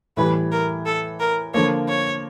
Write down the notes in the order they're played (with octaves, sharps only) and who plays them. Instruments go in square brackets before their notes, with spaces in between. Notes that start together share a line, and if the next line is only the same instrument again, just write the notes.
[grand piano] A2 E3 G3 [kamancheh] B4
[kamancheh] A#4
A4
A#4
[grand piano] D3 F3 A#3 [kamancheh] C#5
[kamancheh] C#5